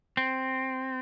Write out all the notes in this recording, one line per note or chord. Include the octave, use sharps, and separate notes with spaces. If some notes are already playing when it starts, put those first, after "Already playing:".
C4